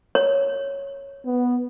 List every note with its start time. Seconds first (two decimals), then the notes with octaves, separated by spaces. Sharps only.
0.15 C#5
1.26 B3